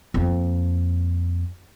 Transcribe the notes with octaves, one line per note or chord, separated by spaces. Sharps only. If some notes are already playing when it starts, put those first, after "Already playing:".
F2 A#3